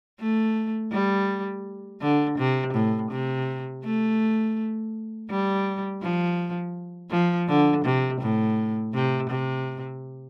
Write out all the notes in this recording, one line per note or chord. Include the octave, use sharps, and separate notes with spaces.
A3
G3
D3
C3
A2
C3
A3
G3
F3
F3
D3
C3
A2
C3
C3